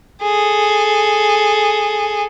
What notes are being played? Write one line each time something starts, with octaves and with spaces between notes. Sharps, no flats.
G#4 A4